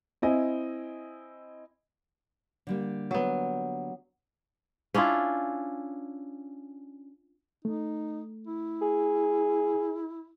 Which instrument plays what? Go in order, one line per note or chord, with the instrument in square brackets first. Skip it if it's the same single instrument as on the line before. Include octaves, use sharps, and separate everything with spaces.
[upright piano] C4 E4 D#5 G#5
[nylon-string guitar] D3 G3 A#3
[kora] F#3 B3
C#4 D4 E4 F4
[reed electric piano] A3 [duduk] D#4
[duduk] E4
[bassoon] G#4